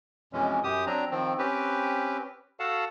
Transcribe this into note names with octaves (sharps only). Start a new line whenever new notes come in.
F2 B2 E3 G#3 C#4
F#2 G4 D#6
F#3 C4 D4 A#5
D#3 F3 C4
C4 C#4 G4 B4
F#4 A4 F5 F#5 A5